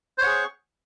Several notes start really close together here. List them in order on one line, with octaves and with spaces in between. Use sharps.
C5 C#5 F#5 G#4 C#6